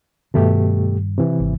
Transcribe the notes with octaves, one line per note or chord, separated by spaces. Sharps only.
G2 B2 D#3 A3 G4
C3 E3
G#1